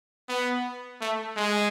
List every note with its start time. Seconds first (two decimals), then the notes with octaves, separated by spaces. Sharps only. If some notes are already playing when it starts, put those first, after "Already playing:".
0.29 B3
1.01 A3
1.36 G#3